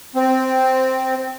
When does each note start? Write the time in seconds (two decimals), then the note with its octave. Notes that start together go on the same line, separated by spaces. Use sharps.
0.15 C4